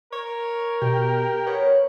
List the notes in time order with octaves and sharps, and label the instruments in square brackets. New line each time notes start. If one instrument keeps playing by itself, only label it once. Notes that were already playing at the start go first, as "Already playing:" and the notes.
[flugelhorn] A#4 [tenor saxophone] C#5
[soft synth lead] B2 [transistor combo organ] G4
[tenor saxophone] B3 [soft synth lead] C#5